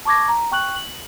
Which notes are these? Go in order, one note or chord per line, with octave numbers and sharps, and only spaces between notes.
A5 C#6 D6 G#6 A#6
A#5
G5 C#6 F#6 F#7
F#7